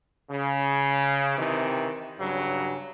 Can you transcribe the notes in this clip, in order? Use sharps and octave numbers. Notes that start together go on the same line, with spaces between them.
C#3
C3 D#3 E3
G2 C#3 F#3